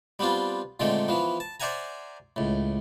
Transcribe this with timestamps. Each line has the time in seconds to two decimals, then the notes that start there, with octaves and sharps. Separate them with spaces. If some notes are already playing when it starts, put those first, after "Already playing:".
0.19 G3 B3 C4 D4 F4
0.80 A#2 D3 D#3 G#3 A3 C4
1.08 E3 F3 B3
1.40 A5
1.60 C5 D5 E5 F#5 G#5 A#5
2.36 C#2 A2